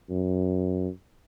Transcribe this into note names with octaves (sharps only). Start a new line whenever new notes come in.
F#2